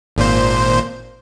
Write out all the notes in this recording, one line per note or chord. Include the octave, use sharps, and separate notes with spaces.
G#1 A#2 C5